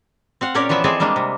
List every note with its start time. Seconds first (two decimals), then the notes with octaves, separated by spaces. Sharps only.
0.41 C4 F5 F#5
0.54 A#2 C#4 G4 A#4 C#5 D5
0.69 E3 F3 B3 E5
0.84 G#3 C4 G#4 A4 D5 E5
1.00 G3 G#3 A#3 D4
1.16 C3